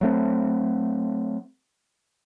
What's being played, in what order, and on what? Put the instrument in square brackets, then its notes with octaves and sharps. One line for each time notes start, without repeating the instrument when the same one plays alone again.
[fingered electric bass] F#3 A3 C4